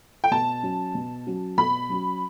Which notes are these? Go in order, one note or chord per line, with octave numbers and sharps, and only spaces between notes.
G5
B2 A5
F#3 C#4 F#4
B2
F#3 C#4 F#4
B2 B5
F#3 C#4 F#4